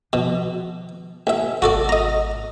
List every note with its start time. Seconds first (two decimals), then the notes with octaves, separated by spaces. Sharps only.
0.13 B2 D#3 F3
1.27 A1 E5
1.62 G#1 F#4 A4 D5
1.89 D#5 A#5